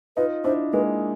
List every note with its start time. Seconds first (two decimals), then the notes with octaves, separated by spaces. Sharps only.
0.17 D#4 F4 B4
0.44 D4 E4 C5
0.73 G#3 A#3 B4